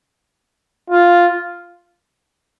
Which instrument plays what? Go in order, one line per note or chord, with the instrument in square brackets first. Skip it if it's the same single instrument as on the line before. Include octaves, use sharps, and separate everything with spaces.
[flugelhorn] F4